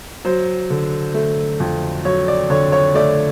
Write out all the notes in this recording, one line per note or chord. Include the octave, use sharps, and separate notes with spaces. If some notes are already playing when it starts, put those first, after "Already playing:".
F#3 C5
D3
A3
F2
F#3 C#5
D5
D3 C#5
C#5
A3 D5